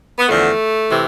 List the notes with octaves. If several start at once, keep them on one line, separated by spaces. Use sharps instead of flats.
B3
E2 D3 F3 A3
C3 E3